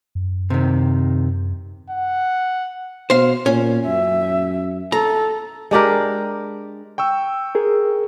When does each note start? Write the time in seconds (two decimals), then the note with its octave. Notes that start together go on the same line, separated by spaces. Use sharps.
0.15 F#2
0.50 C3 D#3
1.90 F#5
3.10 B2 C5 F5
3.46 A#2 C#4
3.87 F#2 E5
4.92 A4 A#5
5.71 G#3 D4 G4 A#4
6.98 G5 C#6 E6
7.55 G#4 A#4